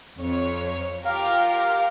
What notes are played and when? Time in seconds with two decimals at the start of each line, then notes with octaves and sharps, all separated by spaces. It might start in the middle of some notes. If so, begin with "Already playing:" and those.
0.18 F2 C#5
1.05 F4 G4 A#4 F5